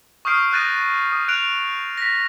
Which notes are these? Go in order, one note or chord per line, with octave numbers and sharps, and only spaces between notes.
C#6 D#6 F6 G6 C7 D7
D#6 F#6 G6 A6 A#6 D#7
D#6
F#6 D7 F7
A#6 B6